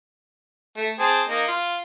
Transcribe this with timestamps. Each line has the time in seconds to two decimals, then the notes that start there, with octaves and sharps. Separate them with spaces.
0.77 A3
0.99 C4 G#4 A5
1.29 A#3 D#4
1.47 F4